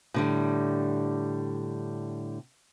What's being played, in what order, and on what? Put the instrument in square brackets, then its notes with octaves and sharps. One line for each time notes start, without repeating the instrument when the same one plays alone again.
[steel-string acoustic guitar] A2 D3 G3